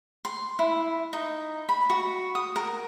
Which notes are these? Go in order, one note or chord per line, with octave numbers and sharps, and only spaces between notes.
C6
E4
D#4
B5
F#4
D#6
A#4